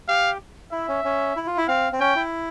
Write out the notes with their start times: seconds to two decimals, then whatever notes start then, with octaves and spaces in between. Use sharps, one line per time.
0.08 G4 F5
0.72 E4 E5
0.88 C#4
1.04 C#4
1.36 E4
1.47 F4
1.57 E4
1.68 C4 F5
1.93 C4
2.00 C#4 G5
2.16 E4